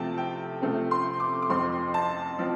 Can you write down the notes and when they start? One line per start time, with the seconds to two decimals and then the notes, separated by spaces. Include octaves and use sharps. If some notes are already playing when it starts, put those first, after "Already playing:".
Already playing: C3 F3 A3 C4 G5 A5
0.18 G5
0.62 C3 F3 A3 C4
0.91 C6
1.20 D6
1.42 D6
1.49 F2 F3 C4 C6
1.94 A5
2.39 F3 C4